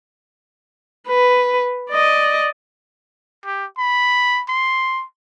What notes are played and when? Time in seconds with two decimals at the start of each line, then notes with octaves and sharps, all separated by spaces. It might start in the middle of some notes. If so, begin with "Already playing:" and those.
1.08 B4
1.90 D5 D#5
3.45 G4
3.78 B5
4.48 C6